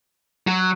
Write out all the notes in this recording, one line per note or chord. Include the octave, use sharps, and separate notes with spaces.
F#3